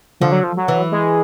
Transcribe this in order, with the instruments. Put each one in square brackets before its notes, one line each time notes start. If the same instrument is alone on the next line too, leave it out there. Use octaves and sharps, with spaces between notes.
[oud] D3 [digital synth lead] F3
[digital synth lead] F#3
F3
F#3
[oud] E3
[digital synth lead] G#3